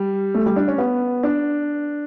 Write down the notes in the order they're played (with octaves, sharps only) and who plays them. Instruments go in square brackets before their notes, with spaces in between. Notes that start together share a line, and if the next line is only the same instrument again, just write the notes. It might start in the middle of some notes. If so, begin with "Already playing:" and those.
Already playing: [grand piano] G3
A3
G3
D4
C#4
B3
D4